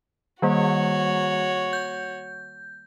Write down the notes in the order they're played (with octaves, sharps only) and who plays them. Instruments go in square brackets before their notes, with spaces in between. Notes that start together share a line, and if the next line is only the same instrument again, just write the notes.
[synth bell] D#3 G3 A#3 [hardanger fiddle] F#4 C#5
[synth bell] G6